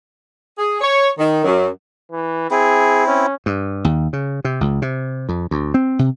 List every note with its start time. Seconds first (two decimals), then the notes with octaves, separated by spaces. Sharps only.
0.58 G#4
0.81 C#5
1.18 D#3
1.44 F#2
2.12 E3
2.51 C4 E4 G#4
3.07 C#4
3.46 G2
3.85 D#2
4.13 C#3
4.45 C3
4.61 C#2
4.82 C3
5.29 F2
5.51 D2
5.74 C4
5.99 C3